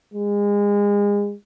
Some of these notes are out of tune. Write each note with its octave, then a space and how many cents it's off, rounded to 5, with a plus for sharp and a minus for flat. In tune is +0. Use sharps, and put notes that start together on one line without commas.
G#3 -30